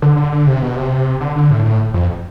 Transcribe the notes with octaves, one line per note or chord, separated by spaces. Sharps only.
D3
D3
D3
C3
B2
C3
D3
D3
A2
A2
F2